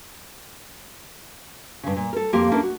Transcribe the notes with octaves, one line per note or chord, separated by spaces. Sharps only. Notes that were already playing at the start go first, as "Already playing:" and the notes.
G2 C#3
A#2
A4 A#4
F2 A#3 C4 G4 F5
A#3 C#4 D4 E4 G4 A4
F#4